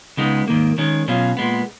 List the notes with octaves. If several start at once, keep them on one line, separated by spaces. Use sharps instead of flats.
C#2 C#3 G#3 B3 D#4
G#2 D#3 A#3
D#3 G#3 C#4
B2 F#3 C#4 F4
A#2 G#3 B3